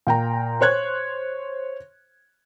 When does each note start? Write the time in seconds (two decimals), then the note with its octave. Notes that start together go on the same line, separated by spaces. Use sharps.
0.07 A#2 G5 A#5
0.61 C5 C#5 F#6 G#6